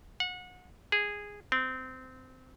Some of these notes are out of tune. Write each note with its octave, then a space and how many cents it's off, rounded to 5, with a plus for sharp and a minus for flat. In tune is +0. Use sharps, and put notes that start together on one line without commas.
F#5 -30
G#4 -10
C4 -20